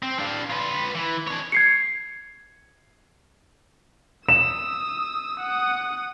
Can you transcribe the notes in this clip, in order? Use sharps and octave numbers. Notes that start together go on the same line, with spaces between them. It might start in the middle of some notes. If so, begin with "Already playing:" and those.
C4
D4 F5
F4 B4
E3
D4 C#5
G#6 C7 C#7
D#6 E6 E7
F#5 D#6